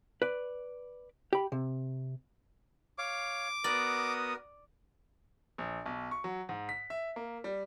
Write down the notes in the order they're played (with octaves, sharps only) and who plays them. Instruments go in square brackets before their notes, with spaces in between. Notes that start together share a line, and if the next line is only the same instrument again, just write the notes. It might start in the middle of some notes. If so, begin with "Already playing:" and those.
[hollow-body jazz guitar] B4 D5
G4 B5
C3
[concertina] C#5 F5 [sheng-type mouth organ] D6
[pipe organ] B3 D#6 [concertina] F#4 A#4 [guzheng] D5
[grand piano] A#1
B1
C#6
F#3
G#2
B6
E5
A#3
G3